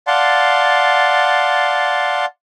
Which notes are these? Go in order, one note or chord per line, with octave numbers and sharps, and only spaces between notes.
D5 F5 F#5 A5 C6